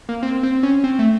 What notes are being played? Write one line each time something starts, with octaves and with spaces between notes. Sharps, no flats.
A#3
C4
C4
C#4
C4
A3